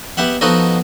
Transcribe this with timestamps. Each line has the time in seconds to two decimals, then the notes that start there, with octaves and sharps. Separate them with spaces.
0.17 B3 G4 E5 F#5
0.41 F3 B3 D#4 F#4 A4 D#5